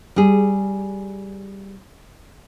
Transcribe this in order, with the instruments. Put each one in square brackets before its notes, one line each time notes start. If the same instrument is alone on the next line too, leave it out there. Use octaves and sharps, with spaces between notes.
[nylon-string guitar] G3 G#4